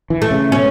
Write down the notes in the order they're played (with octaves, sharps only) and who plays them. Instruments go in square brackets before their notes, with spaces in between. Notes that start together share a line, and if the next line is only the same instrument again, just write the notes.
[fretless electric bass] E3
[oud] A3
[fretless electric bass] C#3
[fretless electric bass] B2 [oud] C#4